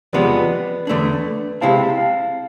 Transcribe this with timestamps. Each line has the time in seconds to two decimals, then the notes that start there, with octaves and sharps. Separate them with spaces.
0.13 E2 C3 F3 G#3 B3 B4 D5
0.87 E2 D3 A3 D4
1.61 C3 G#3 C4 E4 F5 A5
1.98 F5 A5